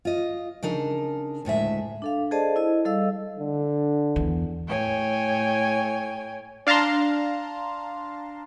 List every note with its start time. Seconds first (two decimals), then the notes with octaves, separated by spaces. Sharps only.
0.05 F4 D#5
0.63 C#3 D4 D#4 A#4
1.45 D2 A2 G#3 E5
2.02 D4 A4 F5
2.31 G#4 A4 C5 D5 D#5 A5
2.56 E4 D#5
2.85 G3 A4 D#5 F5 E6
3.39 D3
4.16 E2
4.66 A2 C#5 G5 G#5
6.67 D4 F5 A5 A#5 C6